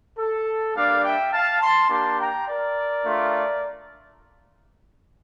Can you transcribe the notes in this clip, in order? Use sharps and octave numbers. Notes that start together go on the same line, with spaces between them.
A4
G3 A#3 D4 D5 F5
E5 G5
F5 A5
A5 C6
A#3 D4 G4 A5 C6
G5 A#5
A#4 D5
A3 D4 F4